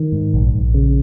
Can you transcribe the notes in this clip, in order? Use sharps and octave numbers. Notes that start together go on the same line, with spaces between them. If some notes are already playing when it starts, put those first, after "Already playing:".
Already playing: D#3
G#2
A#1
A#1
C#3